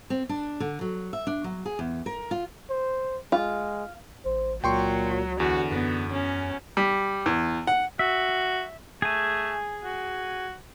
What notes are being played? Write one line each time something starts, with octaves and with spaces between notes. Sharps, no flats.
C4
D4
D3
F#3
E5
D4
F#3
G#4
E2
A#4
F4
C5
G#3 F4
A1 C5
C#2 A#2 F#3 G5 C6 C#6
E2 D3 F#4
F#2 B3
C#4
G3
E2
F#5
F#4 E5
A3 G#4 G#5
F#4